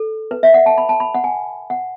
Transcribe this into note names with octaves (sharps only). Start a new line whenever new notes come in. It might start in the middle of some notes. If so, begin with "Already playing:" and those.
Already playing: A4
B4
E5
F#5
A5
B5
A5
B5
F#5
G#5
F#5